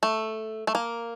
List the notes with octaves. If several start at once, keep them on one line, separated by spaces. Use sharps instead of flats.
A3
A3
A#3